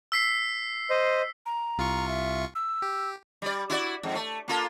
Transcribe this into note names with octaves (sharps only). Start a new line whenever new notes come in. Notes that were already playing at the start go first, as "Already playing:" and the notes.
E6 B6 C7
C5 D#5
A#5
C2 F4 C#6
E5
E6
G4
G3 D5
E4 F#4 D5
F2 G#2
A3
A#3 F4 A4